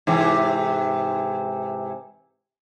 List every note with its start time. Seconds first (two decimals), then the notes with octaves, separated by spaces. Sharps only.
0.07 G#2 C3 E3